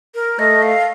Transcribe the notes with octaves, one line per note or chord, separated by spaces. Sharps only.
A#4
A3 D#5
F5